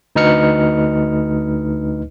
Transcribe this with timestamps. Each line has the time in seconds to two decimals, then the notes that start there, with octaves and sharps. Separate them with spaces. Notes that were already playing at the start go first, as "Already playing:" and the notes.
0.16 D2 D#4 B4 D#5 F6 C#7